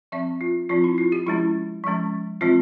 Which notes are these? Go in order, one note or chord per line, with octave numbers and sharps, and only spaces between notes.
F3 C4 E5
F4
F3 C4 F4
E4
F4
G4
F3 G#3 C#4 E4
F3 G#3 C#4
E3 G#3 C4 F4